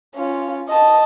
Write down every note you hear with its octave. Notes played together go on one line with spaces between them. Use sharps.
C#4 F4
D#5 A5